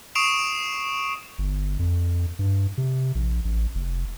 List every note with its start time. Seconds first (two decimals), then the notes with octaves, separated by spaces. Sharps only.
0.15 C#6 D#6 C7 D7 E7 F7
1.38 G1
1.79 F2
2.39 G2
2.78 C3
3.15 A#1
3.45 A1
3.75 F1